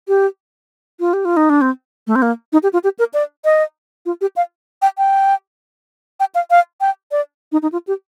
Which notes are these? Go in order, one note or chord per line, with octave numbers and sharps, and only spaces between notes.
G4
F4
G4
F4
D#4
D4
C4
A3
C4
A#3
D#4
G4
F4
G4
A#4
D5
D#5
F4
G4
F5
G5
G5
G5
F5
F5
G5
D5
D#4
D#4
F4
G4